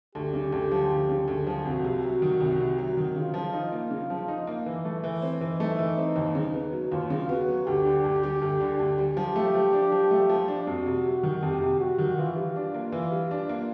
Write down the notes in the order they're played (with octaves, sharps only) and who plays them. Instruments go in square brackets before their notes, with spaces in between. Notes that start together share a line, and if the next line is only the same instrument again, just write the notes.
[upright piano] D2 [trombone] G4
[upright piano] C#3
D2
F3
D2
C#3
D2
F3
[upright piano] C2 [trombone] F#4
[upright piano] C3
F#3
D#3
C2
C3
F#3
D#3
[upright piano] C#3 [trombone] F4
[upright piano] F3
D#4
A#3
C#3
F3
D#4
A#3
E3
A3
E3
C4
[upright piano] E3 [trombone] D#4
[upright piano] A3
E3
C4
D#2
C#3
B3
F#3
[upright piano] D#2 [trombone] F4
[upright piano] C#3
[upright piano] B3 [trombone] F#4
[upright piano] F#3
[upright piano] D2 [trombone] G4
[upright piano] D3
D2
G3
D2
D3
D2
G3
[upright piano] F3 [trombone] G4
[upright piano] A3
F3
D4
F3
A3
F3
D4
[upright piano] F2 [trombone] F#4
[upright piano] C3
G3
D#3
[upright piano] F2 [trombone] G4
[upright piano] C3
[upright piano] G3 [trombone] F#4
[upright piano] D#3
[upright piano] E3 [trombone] F4
[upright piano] G3
D4
A#3
E3
G3
D4
A#3